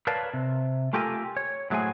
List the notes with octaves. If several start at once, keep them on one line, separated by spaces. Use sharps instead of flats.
A#4 B4 C#5 D5 F5 A5
C3
A3 F4 G4 A4 A#4 G#5
C#5
A2 F#3 A3 G#4 C5 G#5